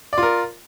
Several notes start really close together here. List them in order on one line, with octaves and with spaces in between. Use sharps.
D5 F4 A#4